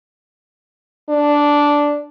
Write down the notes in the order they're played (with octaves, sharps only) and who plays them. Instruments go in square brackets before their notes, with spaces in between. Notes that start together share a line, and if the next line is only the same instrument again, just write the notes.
[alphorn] D4